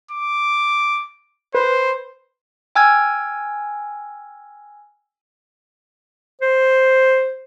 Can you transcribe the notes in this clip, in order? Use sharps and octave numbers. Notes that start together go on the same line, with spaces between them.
D6
B4 C5
G5 G#5 E6 F6 G#6
C5